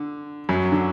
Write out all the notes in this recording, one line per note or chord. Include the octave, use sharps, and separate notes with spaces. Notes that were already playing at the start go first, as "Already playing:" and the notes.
Already playing: D3
F#2 F#3
D3